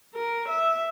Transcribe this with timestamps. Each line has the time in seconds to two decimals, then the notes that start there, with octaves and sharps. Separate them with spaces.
0.14 A#4
0.49 E5